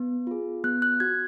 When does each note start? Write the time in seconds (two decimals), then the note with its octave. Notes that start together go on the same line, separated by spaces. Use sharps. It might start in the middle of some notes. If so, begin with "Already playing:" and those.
Already playing: B3
0.27 F4 G#4
0.64 B3 F#6
0.82 F#6
1.00 F#4 G#6